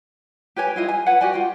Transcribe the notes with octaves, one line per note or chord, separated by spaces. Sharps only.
G4 B4 C#5 G#5
E4 F4 D#5
G#5
B4 C#5 F#5
F#4 G4 D5 G#5
F4 G5